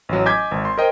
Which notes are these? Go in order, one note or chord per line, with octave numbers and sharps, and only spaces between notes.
A1 F#3
D#5 G#5 D6 G6 G#6 B6
G#1
C6
A#4 C5 D#5 G5